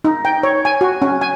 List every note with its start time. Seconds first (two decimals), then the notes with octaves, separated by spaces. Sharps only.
0.04 D#4
0.25 G5
0.43 C#5
0.65 G#5
0.81 F#4
1.02 C#4
1.21 G#5